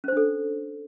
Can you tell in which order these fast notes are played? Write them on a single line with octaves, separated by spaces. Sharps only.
C#4 C5 D4 A4